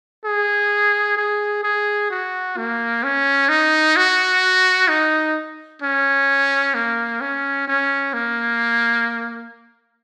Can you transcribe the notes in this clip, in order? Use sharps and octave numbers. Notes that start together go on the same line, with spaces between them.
G#4
G#4
G#4
F#4
A#3
C#4
D#4
F#4
D#4
C#4
A#3
C#4
C#4
A#3